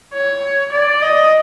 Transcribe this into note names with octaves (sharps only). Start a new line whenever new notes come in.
C#5
D5
D#5